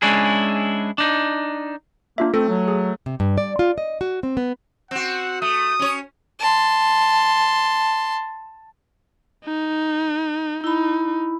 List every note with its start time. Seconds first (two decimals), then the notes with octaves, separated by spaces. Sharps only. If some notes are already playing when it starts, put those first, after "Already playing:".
0.02 G#3 C#4 D4 E4 G#4
0.98 D4 D#4
2.18 A#3 D4 F4 E5
2.34 A3 C4 A4
2.48 F#3
2.68 G#4
3.06 C3
3.20 G2
3.38 D5
3.59 F4
3.78 D#5
4.01 F#4
4.23 C4
4.37 B3
4.91 C4 F#4 F#5
5.42 A3 D#6
5.79 C#4 C#5
6.39 A5 C6
9.44 D#4
10.64 D#4 E4 B5